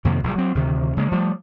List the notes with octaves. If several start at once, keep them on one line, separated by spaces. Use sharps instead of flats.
F2 C3 D#3 A#3
A#1 C3 G3
F#3 C4
D2 C3 D#3
C#3 G#3 A#3
F3 G3 A3